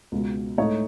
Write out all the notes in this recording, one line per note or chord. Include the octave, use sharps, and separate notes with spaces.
C#2 B2 G#3
A2 G#3 D#4 A4 C#5